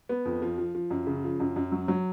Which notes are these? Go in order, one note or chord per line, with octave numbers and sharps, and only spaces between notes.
B3
F2
F3
F3
F3
F#2
C#3
F3
F#2
F#2
F#3
F#3